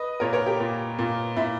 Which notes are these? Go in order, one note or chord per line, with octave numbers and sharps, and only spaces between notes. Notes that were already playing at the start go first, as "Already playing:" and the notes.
Already playing: B4 D#5
A#2 A#4 C#5
A#4 C#5
G4 A#4
A#2
A#2
A#2 E4